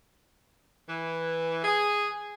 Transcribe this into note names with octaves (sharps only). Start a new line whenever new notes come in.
E3
G#4